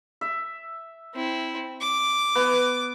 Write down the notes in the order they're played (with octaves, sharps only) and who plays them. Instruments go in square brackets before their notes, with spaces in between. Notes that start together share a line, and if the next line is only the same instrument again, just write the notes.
[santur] E5
[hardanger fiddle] C4 E4
D6
[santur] B3